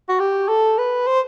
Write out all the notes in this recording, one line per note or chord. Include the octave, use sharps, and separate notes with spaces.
F#4
G4
A4
B4
C5